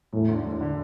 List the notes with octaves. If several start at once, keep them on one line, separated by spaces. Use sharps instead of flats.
E1 A2
D2 D3
E1
D3